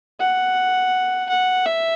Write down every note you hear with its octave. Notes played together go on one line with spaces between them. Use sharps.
F#5
F#5
E5